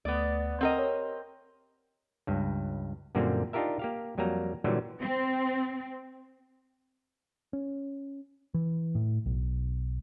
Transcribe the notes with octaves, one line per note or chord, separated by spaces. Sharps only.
D2 A3 B3 D5 D#6
C4 A#4 D#5 F#5
G4 C#5
C#2 G2
F#2 A#2 D3 G3 A#3 C4
D4 D#4 F4 G4 A#4 E5
A#3 G4 F5
F2 F#3 G3 A#3 A#5
A#2 D3 E3 F#3 G3
C4
C#4
E3
A2
B1